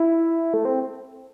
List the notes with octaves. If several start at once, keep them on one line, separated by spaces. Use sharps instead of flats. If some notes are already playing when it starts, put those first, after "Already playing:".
Already playing: E4
A3
C4